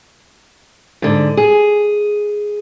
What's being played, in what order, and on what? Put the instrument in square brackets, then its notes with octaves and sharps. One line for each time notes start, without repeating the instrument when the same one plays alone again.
[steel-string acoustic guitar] G#2 D3
G#4